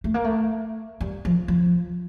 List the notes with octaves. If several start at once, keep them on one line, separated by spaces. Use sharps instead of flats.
A3
A#3
A3
G3
F3
F3